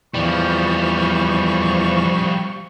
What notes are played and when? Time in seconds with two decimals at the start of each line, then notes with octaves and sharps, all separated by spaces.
0.14 E2 F3 G3 C#6